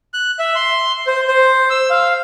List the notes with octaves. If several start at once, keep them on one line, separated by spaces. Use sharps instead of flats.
F#6
E5
C6
C5
C5
E6
F5